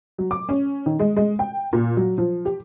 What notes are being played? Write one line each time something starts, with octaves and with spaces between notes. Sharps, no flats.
F#3
D6
C#4
D#3
G#3
G#3
G5
A#2
F#3
F3
G4